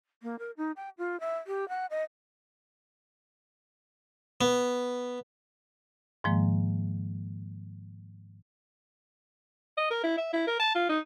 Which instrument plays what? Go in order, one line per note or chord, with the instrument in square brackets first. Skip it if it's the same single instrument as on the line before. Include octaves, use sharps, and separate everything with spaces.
[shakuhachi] A#3
A#4
D#4
G5
F4
E5
G4
F#5
D#5
[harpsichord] B3
[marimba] G#2 D#3 F3 G#3 A#3
[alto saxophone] D#5
A#4
E4
E5
E4
A#4
A5
F4
D#4